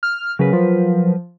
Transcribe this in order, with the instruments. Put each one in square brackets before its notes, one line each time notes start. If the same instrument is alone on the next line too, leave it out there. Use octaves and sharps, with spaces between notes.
[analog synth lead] F6
[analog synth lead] C#3 [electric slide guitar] F#3 A#4 B4
[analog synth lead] F3